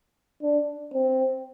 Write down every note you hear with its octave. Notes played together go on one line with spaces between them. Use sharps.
D4
C4